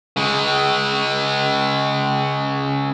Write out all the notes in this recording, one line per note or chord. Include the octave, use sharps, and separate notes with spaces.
C#3 G#3